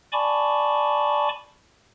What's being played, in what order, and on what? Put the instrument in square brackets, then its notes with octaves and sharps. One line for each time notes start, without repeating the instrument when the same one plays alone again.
[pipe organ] D5 G#5 A5 B5 C#6 D6